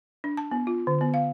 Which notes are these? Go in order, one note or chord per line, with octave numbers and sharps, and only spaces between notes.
D4
A5
B3
F4
D3
B3
F5